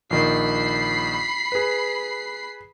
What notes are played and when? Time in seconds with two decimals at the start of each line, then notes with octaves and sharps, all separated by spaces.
0.11 A#1 D#3 B5 C7
1.52 G#4 B4